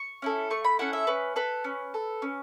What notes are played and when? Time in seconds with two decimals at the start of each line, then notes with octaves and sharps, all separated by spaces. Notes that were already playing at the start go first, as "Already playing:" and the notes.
Already playing: C#6
0.22 C#4 E4 A4
0.51 A3 C#6
0.64 B5
0.79 C#4 E4 A4 F#5
0.93 E5
1.07 C#4 B4
1.36 A4 B4
1.64 C#4
1.94 A4
2.22 C#4